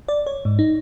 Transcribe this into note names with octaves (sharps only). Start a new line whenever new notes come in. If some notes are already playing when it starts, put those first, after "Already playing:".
D5
C#5
G#2
D#4